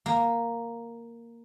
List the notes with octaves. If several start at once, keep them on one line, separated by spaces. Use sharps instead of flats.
A#3